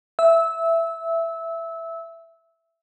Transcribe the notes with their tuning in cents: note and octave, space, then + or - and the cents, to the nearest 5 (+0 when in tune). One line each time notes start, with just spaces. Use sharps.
E5 +10 E6 -20